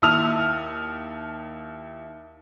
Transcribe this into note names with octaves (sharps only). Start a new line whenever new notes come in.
D#2 E4 A5 D#6 F6 F7